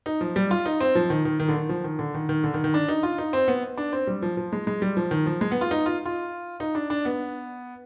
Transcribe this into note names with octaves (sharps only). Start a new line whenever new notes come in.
D#4
F3
G3
F4
D#4
C4
F3
D#3
D#3
D#3
D3
D#3
F3
D#3
D3
D#3
D#3
D3
D#3
D#3
D4
D#4
F4
D#4
C4
B3
D4
C4
G3
F3
F3
G#3
G#3
G3
F3
D#3
F3
G#3
B3
F4
D#4
F4
F4
D#4
D4
D4
B3